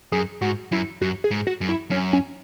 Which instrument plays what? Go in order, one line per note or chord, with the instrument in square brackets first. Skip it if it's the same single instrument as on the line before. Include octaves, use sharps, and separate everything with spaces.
[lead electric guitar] F#2 [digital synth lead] G#4
[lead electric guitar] G#2 [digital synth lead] F#4
[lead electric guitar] F#2 [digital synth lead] E4
[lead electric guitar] F#2 [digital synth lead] F#4
[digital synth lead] G#4
[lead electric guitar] G#2
[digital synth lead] F#4
[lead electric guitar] F#2
[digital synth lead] E4
[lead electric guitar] F#2 [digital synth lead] C#4
[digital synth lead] C#4